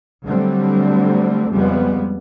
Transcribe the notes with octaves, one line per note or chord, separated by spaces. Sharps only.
D3 F#3 G3 A3 C4
F2 C#3 G3 G#3 B3